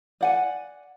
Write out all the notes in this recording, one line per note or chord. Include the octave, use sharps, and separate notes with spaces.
D5 F#5 G#5